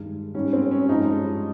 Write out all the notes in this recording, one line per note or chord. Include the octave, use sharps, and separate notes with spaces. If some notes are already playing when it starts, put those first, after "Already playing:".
Already playing: G2 D#3 G#3
G#2 G3 C#4
C4
C#4
G2 F3 G#3 D#4